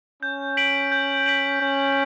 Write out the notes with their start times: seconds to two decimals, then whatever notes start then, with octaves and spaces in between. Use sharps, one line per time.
0.23 C#4 G6
0.57 B6 D7 F#7
0.92 G6
1.26 B6 D7 F#7
1.61 C#4 G6